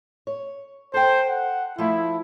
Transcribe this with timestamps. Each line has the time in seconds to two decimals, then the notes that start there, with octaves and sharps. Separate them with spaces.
0.27 C#5
0.94 A4 C5 G5
1.29 F#5
1.78 F3 A3 E4